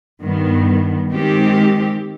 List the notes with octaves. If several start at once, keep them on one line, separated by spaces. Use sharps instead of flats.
G2 D#3 B3
D#3 G#3 C4 G4